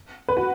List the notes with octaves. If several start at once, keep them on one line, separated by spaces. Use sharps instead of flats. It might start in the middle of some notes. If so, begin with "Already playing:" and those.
B4
F#4